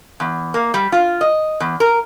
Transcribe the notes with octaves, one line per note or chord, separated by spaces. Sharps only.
E2
A#3
G3
F4
D#5
E2
A#4